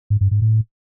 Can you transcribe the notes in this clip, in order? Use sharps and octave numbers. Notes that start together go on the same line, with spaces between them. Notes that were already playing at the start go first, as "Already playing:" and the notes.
G#2
G2
G#2
A2